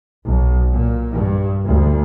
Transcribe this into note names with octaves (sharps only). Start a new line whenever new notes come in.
B1
A#2
G2
D2